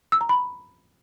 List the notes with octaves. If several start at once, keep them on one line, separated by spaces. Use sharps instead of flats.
E6
A#5
B5